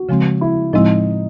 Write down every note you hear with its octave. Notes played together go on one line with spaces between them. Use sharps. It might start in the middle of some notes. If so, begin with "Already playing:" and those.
Already playing: F#4
C#3 F3 G#3 C4
E4
A2 F3 G#3 C4 D#4 E4